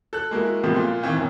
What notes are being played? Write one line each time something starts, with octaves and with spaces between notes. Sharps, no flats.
A4 F#6
G#3 A#3 E4 F#4
A2 C3 F3 G#3 A#3 B3
A#2 F4
D#3 E3 C4
F#2 B2